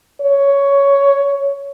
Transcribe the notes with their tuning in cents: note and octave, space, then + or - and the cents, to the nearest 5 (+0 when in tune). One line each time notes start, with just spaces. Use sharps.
C#5 +10